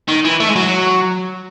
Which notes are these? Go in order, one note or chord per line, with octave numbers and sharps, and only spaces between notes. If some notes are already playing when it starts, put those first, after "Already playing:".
D#3
E3
A3
G#3
F#3